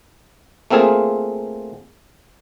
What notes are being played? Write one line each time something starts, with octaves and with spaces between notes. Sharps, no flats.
A3 A#3 C4 F4 G#4